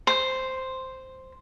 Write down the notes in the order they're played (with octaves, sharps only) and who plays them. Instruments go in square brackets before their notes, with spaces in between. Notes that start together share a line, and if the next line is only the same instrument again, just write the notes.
[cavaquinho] C5